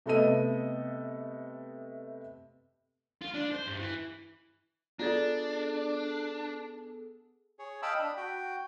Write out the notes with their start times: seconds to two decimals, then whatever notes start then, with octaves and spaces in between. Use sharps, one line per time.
0.06 C3 A3 B3 A4 D#5 D#7
3.22 F4
3.34 D4
3.52 C5
3.67 G2
3.79 E3
4.99 B3 D4 F4 G#4 A4 D5 A6
7.59 G#4 C#5
7.82 D#5 F5 G5 A5 B5 E6
7.98 D4 B5
8.17 F#4 G5